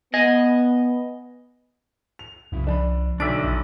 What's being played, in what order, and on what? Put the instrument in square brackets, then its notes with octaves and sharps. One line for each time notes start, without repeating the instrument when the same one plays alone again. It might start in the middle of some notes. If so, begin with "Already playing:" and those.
[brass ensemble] B3 [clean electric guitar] D#5 G#5
[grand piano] F7
[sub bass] C2 [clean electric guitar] F#2 C#3 E4
[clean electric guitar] F3 A5 B5 [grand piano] D4
[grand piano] B1 D7 [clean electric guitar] D3 [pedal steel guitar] D4 D5 E5
[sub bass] A#1 [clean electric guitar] E4